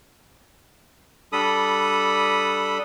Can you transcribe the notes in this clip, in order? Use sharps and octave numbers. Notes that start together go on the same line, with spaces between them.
G3 D4 A4 B5 D#6